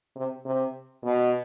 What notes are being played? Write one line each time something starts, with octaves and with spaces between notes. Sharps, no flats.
C3
C3
B2